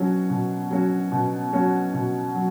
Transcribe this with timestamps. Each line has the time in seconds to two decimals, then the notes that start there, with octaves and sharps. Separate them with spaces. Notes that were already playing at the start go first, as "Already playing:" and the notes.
Already playing: B2 F#3 C#4 F#4
0.30 B2
0.71 F#3 C#4 F#4
1.12 B2
1.53 F#3 C#4 F#4
1.94 B2
2.35 F#3